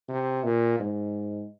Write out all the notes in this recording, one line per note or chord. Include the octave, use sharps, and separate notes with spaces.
C3
A#2
G#2